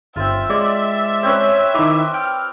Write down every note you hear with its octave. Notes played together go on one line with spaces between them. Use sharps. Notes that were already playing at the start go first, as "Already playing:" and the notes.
G1 C4 F4 E5
G#3 D5
C4 C#4 B4
D#3 D#4 E4 D6
G5 F6